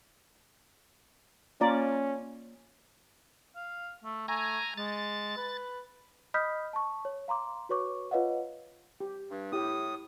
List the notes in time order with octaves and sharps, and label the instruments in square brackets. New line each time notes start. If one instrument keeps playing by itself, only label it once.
[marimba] A#3 A#5 [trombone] C#4 [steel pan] F4 D5
[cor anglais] F5
A3
[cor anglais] A3 [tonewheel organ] G#5 A#5
[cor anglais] G#3 [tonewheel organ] A6
[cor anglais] B4
[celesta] D#5 B5 D#6 F6 G6 B6
A5 C#6
C#5
F5 A#5 C6 D6
F#4 B4 C#5 C#6 D6
F4 B4 C#5 D#5 F5 F#5
[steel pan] G4
[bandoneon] G2
[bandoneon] A2 D#6 [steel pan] E4 G4